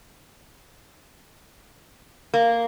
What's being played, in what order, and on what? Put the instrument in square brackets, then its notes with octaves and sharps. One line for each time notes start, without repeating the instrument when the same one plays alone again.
[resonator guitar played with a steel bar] A#3